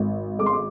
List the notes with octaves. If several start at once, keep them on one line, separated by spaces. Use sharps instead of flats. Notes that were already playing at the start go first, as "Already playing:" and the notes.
Already playing: G#1
G#3 D6
C6
D6